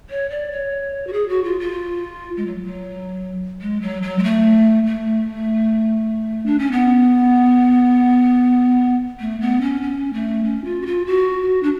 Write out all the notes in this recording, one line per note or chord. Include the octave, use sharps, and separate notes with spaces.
C#5
D5
C#5
F#4
G#4
F#4
F4
F4
G#3
F#3
F#3
G#3
F#3
F#3
G#3
A3
A3
D4
C#4
B3
A3
B3
C#4
C#4
A3
C#4
F4
F#4
F4
F#4
D4